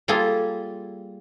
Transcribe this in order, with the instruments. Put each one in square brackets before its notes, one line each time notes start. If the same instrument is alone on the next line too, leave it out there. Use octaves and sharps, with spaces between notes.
[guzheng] G3 A#3 F4 G#4 A4